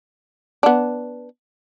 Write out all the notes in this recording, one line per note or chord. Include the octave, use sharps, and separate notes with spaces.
B3 D4